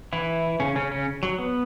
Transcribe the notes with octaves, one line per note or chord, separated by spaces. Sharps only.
E3 E4
C#3 C#4
C#3 C#4
C#3 C#4
F#3
B3